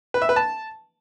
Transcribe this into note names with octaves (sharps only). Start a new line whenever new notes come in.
B4
E5
B4
A5